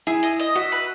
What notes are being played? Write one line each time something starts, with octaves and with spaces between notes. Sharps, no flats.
E4 G#4
D#5
D#5
F#4 E5
B4